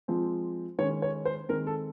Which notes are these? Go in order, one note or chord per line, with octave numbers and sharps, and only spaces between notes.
F3 G#3 C4
D#3 G#3 C#4 C#5
C#5
C5
D#3 G#3 C4 A#4
A4